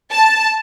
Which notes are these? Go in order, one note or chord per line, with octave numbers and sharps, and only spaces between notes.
A5